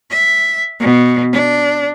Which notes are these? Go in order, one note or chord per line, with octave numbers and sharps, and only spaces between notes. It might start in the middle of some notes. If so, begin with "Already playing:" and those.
E5
B2
D4